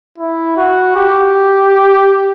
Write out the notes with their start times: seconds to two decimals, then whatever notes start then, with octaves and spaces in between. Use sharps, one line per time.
0.18 E4
0.57 F#4
0.96 G4